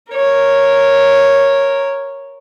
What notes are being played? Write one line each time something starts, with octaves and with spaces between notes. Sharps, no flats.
A#4 C#5